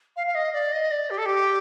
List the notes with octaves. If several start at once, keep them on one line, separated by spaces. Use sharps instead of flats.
F5
F5
D#5
D5
D#5
D5
G4
A4
G4